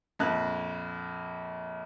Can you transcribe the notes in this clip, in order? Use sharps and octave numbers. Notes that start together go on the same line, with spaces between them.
A#1 F2 F#6